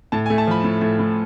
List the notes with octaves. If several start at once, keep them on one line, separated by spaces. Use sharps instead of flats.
A2 A5
G#5
A3
A5
F3 B5
A2
A2
A2